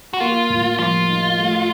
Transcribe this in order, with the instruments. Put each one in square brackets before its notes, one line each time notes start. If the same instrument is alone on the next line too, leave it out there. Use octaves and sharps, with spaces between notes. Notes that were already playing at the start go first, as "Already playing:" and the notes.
[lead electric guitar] F#4
[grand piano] A#3 [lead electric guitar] F4
[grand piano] A2
[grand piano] F3 [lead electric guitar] F4
[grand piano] D#4
A3